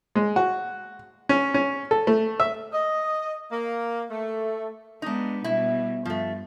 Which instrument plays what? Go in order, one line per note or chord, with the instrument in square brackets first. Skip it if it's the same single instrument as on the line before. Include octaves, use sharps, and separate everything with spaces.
[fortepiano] G#3
F#4
C#4
C#4
A4
A3
E5
[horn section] D#5
A#3
A3
[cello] G#3 B3 [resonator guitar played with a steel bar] D4 D#4
[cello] B2 G3 [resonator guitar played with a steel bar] E4
[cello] G2 [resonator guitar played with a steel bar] F3 A3